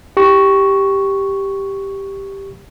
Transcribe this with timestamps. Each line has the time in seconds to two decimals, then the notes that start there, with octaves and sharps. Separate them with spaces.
0.17 G4 C#6